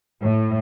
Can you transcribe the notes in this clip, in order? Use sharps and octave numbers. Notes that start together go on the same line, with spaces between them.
A2